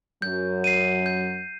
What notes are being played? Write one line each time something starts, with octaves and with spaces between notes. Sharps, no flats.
F#2 F#3 G6
C7 D#7
G6